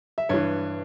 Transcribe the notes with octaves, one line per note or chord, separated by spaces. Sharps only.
E5
G2 E3 C#5